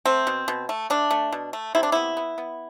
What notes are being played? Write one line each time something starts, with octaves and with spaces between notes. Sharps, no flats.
A3 C4
B2
B2
A3
A3 D4
A3
B2
A3
C3 E4
D4
B3 E4
B3
B3